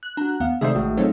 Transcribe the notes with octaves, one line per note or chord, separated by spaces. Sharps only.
F#6
D4 F#4 A#5
D#2 B3 F5
C3 D#3 G#3 A3 G#4 C5 D5 E5
A1 A2 E4 F#4
F#3 C4 C#4 D#4 F4 A4